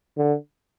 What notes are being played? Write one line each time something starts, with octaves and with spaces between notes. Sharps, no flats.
D3